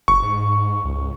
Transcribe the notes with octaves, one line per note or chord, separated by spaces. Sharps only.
F#1 C#6
G#2
C#2